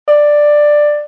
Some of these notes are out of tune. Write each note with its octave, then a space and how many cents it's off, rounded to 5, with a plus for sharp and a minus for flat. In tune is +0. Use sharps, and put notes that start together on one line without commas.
D5 +10